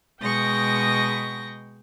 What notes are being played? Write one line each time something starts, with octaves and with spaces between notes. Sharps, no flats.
B2 G#3 G5 C#6 A#6